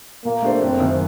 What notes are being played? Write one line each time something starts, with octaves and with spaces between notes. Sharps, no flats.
A#2 A#3
A3 D4 G4 C5
F#1 C4
F#2 D#3